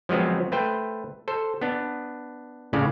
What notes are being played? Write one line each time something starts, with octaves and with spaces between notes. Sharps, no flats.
F3 F#3 G#3 B3 C4
A3 B4 C5 G5
A4 C5
B3 D4
A2 C#3 C#4 D5 F5